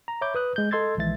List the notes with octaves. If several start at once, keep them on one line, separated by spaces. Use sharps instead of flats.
A#5
C#5 E5 B5 D6 G6
B4 D#6 F#6
G#3 G6
A4 D#5 C6 E6 G#6 A6
A#1 D#3 E3 G#3 E5 A6